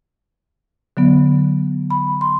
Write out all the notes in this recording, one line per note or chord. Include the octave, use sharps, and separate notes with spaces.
D3 F#3 B3
B5
C6